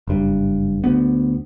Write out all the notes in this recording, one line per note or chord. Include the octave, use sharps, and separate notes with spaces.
F#1 G2
D2 B3